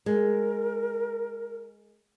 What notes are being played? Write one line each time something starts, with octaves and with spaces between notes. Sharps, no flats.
G#3 A#4